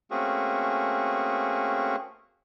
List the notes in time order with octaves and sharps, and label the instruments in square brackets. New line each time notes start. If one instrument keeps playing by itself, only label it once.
[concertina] A3 A#3 C4 C#4 F#4 G#4